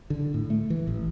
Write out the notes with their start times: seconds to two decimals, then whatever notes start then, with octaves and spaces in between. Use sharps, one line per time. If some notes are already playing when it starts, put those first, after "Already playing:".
0.10 D3
0.34 A2
0.50 A3
0.70 E3
0.87 A1